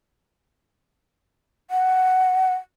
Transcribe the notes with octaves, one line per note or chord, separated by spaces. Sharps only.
F#5